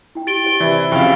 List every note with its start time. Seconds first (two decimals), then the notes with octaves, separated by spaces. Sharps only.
0.15 E4 G5
0.27 F#4 G4 A6 D7 G7
0.44 G4 C5 F#5
0.60 C3 E3 E4 D5 E6
0.92 F2 C#3 F#4 F5 G5 C#6